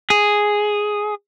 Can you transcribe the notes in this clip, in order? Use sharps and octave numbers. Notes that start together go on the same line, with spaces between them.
G#4